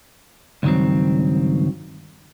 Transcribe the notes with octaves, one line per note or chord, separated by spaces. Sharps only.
C#2 G2 D#3 F#3 C4